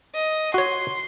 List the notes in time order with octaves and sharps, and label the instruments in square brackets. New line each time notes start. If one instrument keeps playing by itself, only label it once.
[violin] D#5
[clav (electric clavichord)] F#4 C#5 [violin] C6